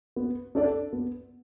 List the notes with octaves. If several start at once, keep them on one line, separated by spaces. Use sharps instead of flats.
B3
D4 A4 D5
B3